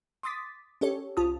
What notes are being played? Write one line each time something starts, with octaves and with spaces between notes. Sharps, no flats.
C6 D6 D#6 A6 B6
C#4 G4 A4 C#5
C2 F4 A5 D#6